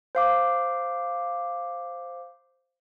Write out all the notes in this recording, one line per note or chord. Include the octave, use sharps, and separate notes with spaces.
C5 F5 D6